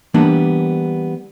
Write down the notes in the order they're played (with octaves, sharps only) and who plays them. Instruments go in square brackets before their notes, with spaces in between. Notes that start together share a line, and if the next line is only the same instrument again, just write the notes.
[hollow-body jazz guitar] E3 G3 A#3 B3 D4